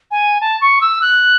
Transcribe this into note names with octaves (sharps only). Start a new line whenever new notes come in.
G#5
A5
C#6
E6
F#6